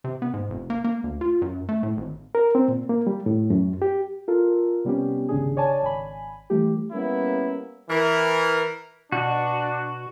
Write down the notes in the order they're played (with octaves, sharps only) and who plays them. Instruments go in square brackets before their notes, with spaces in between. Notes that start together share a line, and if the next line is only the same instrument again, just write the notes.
[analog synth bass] C3
B3
G#2
F1
A#3
A#3
D2
F4
F#2
A3
A2
G#1
[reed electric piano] A#4
C4
A#2
A#3
G3
A2
F#2
G4
[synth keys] F4 A4 A#4
C3 G3 B3 C#4 G4
G#1 C#3 D4 G#4
C#5 D5 G#5 A5
G#1 G#5 B5
E3 G3 A3 G4
[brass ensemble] G3 A#3 B3 C#4 E4
[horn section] E3 A#4
[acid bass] B2 [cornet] D4 [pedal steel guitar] F#4